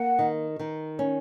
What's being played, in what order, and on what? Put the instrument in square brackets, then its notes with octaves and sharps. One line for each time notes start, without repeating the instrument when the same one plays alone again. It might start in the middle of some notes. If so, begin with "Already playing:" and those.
Already playing: [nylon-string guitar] A#3 [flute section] F#5
[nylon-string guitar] D#3
D#3
C#4